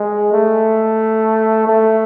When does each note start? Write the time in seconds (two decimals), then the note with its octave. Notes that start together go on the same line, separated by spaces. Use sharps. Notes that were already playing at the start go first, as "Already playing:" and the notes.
Already playing: G#3
0.32 A3
1.67 A3